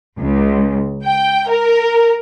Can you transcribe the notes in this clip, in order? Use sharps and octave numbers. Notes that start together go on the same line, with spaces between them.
C#2
G5
A#4